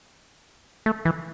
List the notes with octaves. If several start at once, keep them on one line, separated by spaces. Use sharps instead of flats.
A3
E3